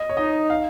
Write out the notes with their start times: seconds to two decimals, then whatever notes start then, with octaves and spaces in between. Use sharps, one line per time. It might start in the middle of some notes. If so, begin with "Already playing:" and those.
Already playing: D#5
0.09 C#5
0.17 D#4 D#5
0.50 F5